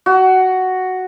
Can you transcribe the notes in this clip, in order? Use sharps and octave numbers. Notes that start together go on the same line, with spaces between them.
F#4